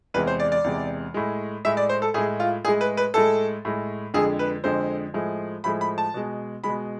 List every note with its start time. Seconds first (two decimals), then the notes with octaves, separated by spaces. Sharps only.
0.14 E2 C3 G#3 B4
0.27 C5
0.40 D5
0.52 D5
0.64 E2 C3 G#3
1.14 A2 G#3
1.65 A2 G#3 E5
1.77 D5
1.89 C5
2.02 A4
2.14 A2 G#3 G#4
2.40 F4
2.65 A2 G#3 G#4
2.81 B4
2.97 B4
3.14 A2 G#3 A4
3.65 A2 G#3
4.14 F2 D3 G#3 G#4
4.39 B4
4.64 F2 D3 G#3 C5
5.14 A2 F3 G#3
5.64 A2 F3 G#3 B5
5.81 B5
5.98 A5
6.14 B2 G#3
6.64 B2 G#3 B5